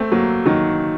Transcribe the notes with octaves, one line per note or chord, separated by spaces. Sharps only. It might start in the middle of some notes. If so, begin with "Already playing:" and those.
Already playing: A3 C4
F#3 A#3
D#3 F#3